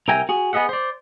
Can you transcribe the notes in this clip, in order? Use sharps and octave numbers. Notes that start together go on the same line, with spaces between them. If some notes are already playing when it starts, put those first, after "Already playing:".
C2 A#4 E5 G5 G#5 A#5
F#4 G#4
B3 G#4 D#5 E5 F#5
C5 D5